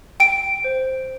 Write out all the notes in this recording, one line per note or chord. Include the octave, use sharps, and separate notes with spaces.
G5 D7
C5